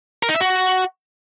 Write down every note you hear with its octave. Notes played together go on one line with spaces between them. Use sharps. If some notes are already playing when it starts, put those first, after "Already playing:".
A#4
D#4
E5
F#4